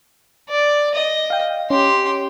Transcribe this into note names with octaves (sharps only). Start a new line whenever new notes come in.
D5
D#5
F5 G5
C#4 G4 C6